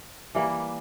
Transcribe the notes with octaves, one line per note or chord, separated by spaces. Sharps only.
E3 G3 A#3